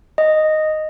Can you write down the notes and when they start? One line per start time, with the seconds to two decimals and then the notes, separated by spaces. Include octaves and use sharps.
0.18 D#5